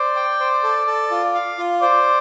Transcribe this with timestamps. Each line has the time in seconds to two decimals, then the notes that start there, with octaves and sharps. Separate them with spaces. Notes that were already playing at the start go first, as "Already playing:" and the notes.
Already playing: C5 D5
0.16 G5
0.40 C5
0.63 A4
0.87 A4
1.11 F4
1.34 F5
1.58 F4
1.82 C5 D5